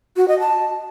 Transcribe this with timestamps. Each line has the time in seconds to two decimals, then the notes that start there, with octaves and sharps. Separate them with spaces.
0.17 F#4
0.28 D#5
0.40 A5